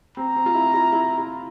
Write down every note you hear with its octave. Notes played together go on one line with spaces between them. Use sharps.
C4 A#5
C4
F4
E4
E4
E4
E4